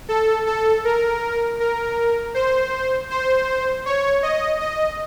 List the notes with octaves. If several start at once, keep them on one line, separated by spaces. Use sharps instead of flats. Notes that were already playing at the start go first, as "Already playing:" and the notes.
A4
A4
A#4
A#4
C5
C5
C#5
D#5
D#5